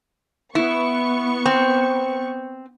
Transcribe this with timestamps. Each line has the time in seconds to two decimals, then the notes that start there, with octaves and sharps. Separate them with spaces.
0.55 B3 E4 C#6
1.46 C4